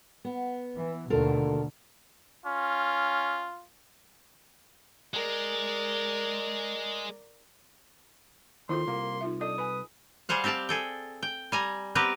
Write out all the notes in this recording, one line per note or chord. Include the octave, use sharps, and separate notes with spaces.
B3
E3
D#2 B2 D3 A3 F4 A4 A#4
C#4 F4
G#3 A#4 D5
D#2 C4 E4 F4 A4 C6
C2 A#3
D#4 F4 E5
D4 A4 D#5 D#6
B4 G#5 B5
G3 G#4 C5 F5 F#5
C4 G4 D5 F5 A5
G#4 A4 G5
G5
G3 G#5 A#5
B3 C4 G4 A#4 B4